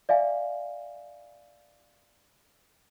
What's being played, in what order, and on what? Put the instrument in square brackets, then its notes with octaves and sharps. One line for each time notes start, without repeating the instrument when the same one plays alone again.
[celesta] D5 E5 F5 G#5